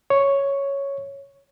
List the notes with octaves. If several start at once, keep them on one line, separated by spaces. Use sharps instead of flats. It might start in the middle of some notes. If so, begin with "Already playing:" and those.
C#5